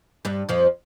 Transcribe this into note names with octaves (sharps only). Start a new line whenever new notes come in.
G2 G3
F2 F3